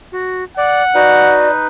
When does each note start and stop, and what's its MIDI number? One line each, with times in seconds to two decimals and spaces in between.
0.12 0.44 66
0.57 0.83 74
0.57 1.37 78
0.95 1.68 63
0.95 1.47 66
0.95 1.68 71
0.95 1.50 74